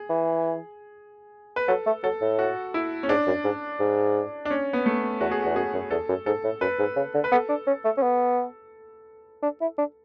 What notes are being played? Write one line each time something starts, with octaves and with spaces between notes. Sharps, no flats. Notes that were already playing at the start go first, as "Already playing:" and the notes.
Already playing: G#4
E3
B4
F#3 A4
A3
F#3 A4
A2
F#4
E4
C#4
G#2 D4
F#2
G#2
G#2
D4
C#4
B3
A3
E2 F#4
G#4
E2 F#4
F#2 G#4
F#2
E2 A4
F#2
G#2 A4
A2
F#2 B4
G#2
C#3
D3
B4
B3 A4
D4
C#4
A3
C#4
B3
D4
E4
D4